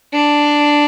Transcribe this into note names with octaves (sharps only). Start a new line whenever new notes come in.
D4